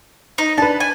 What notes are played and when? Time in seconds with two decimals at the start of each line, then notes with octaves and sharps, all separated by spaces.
0.38 D#4
0.58 D4 B4 A5
0.80 G#5